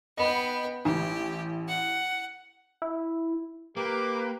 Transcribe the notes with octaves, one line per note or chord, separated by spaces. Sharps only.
B3 D#5 G5 B5
A1 G4
F#5
E4
A#3 G4 B4 A#5 D6